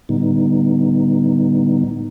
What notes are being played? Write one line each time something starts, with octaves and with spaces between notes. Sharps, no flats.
A2 D3 G3 B3 D#4